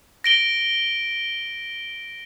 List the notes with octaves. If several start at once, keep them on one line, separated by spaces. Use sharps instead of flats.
A#6 D7 G7